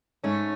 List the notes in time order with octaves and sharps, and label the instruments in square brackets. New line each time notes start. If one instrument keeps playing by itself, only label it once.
[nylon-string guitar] G#2 [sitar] A3 C#4